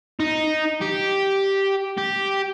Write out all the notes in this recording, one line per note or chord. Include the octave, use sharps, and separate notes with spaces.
D#4
G4
G4